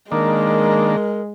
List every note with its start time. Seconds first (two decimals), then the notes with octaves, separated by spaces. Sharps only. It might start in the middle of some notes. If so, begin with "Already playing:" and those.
0.12 D#3 G#3 A#3 D4 A#4